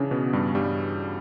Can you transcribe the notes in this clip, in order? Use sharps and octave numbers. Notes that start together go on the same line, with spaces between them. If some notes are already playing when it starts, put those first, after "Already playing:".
Already playing: C#3 E3 C#4 D4
B2 B3
G2 G3
G2 G3